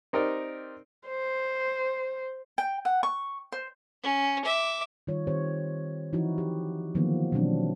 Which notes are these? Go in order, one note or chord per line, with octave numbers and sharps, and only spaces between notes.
C4 D#4 G4 A#4 C5 D5
C5
G5
F#5
C#6
C5
C#4
E5 D6
D#3 G3 F4 C#5
D#3 C4 G4 C5 C#5
E3 F3 D#4 E4 F#4
G4
D3 D#3 F3 F#3 A#3 B3
B2 D#3 E3 F#3 C4 D4